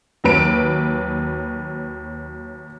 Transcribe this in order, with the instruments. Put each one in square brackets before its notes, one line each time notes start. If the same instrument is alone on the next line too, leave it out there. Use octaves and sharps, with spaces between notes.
[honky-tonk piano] D#2 F#3 B4 D7